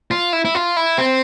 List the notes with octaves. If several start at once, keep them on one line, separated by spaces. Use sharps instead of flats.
F4
E4
E4
F4
E4
C4